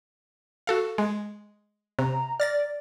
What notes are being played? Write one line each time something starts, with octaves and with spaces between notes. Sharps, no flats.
F#4 A4 F5
G#3
C3 A#5
D5 F6 A6 A#6